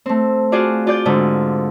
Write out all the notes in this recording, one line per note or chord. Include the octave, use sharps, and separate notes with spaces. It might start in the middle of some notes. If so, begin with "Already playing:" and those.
A3 C4
F4 F#4 G#4 D5 F5
F4 D5 G6
G#2 D3